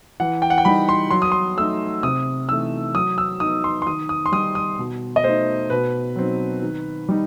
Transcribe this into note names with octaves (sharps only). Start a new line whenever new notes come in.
E3 F#5
G5
F#5
G5
G3 D#4 B5
C6
F#3 C6
D#6
C6
A3 D#4 E6
C3 D#6
E3 A3 D#4 E6
F#3 D#6
E6
B3 D#4 D#6
C6
C6
D#3 D#6
D#6
C6
G3 D#4 D#6
D#6
B2
D#5
A3 D#4 C5
B2 B4
F#3 C4 D#4
D#3
G3 D#4